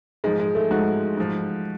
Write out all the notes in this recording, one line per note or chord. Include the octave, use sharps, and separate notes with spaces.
G#2 F3 G#3
G#3
A3
G#2 F3 F#4
G#2 F3